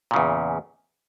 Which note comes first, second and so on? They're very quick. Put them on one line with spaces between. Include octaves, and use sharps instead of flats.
A#2 C#3 E2